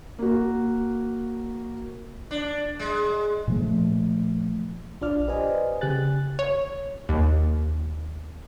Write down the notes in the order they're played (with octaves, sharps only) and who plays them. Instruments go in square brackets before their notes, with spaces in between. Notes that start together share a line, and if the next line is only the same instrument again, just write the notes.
[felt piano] A#3 F#4
[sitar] D4
G#3
[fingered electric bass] A#2 F3 A3
[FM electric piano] A#1 D4 F4 D5 F6
G4 B4 C5 D5 D#5 G#5
C#3 G4 G#5 F#6 A6
[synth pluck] C#5
D#2